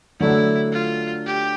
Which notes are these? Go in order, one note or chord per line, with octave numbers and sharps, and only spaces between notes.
D3 F#3 A3 D4 E4
F4
G4